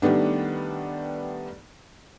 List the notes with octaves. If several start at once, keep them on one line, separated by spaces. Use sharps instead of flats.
D#3 G3 A3 B3 D4